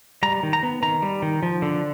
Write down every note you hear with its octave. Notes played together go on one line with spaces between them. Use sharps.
G3 A#5
D#3
A#5
B3
D#3 A#5
G3
D#3
F3
D3